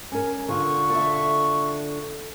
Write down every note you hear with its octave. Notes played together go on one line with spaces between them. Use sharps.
C#4 A#4 G#5
D3 F4 C#6
A4 E5